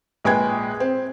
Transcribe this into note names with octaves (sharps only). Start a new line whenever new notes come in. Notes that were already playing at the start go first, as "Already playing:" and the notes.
A#1 G#3 B4 G5 G#6
C4